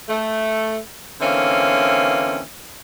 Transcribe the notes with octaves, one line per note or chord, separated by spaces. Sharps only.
A3
D3 E3 A#3 C4 C#4